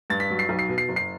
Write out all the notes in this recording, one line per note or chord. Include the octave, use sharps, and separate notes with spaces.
G2 A6
B6
F#3
C7
B1
C7
B2
C7
F#1
C7